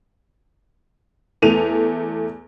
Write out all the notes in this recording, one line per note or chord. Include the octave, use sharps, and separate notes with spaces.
E2 A3 D#7 F7